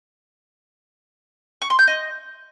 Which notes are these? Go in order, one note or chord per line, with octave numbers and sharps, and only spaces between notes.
C#6
C6
G6
D#5